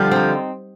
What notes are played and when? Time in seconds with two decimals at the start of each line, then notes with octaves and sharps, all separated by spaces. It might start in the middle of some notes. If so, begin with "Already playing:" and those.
Already playing: D3 F3 G3
0.11 C4 D#4